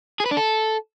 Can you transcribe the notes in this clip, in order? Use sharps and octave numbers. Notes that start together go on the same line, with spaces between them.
G#4
B4
D4
A4